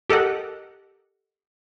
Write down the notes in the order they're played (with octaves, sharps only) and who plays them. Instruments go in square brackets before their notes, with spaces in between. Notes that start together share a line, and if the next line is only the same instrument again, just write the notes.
[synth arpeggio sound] G4 A4 A#4 D#5 F#5